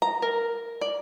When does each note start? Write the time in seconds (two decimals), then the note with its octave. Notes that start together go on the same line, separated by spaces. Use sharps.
0.02 A#5
0.22 A#4
0.81 D5